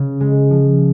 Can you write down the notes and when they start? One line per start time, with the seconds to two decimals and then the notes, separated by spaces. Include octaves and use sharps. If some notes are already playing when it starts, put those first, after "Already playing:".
Already playing: C#3
0.20 G#3
0.50 F3